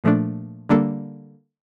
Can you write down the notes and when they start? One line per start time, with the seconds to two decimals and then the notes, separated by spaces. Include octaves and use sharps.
0.04 A#2 F3 A3 D4
0.69 D3 G3 A#3 D4 A4